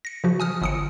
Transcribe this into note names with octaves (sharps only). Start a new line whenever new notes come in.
A#6 C#7
C#3 F3 F#4
G#5 D#6 F6
G1 D#6 C#7